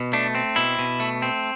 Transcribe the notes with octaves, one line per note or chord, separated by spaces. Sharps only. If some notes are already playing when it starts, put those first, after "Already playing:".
Already playing: B2
A3 D4
C4
B2 E4
B2
A3
C4